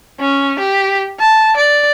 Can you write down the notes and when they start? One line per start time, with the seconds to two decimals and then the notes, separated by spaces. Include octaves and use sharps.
0.20 C#4
0.60 G4
1.19 A5
1.57 D5